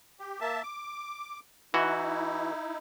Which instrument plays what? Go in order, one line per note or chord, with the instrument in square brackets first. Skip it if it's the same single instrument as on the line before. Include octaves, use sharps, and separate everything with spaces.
[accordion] G4
A#3 E5 A5
D6
[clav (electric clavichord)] E3 F#4 [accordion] D#4 E4